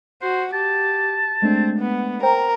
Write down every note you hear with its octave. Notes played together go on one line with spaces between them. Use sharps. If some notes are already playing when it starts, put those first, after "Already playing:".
F#4 C5
G4 A5
G#3 A3 C4 D4
B3
A#4 C5 G5 A#5